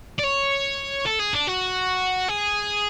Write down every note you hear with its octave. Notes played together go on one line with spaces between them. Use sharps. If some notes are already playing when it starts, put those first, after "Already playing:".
D5
C#5
A4
G#4
D4
F#4
G#4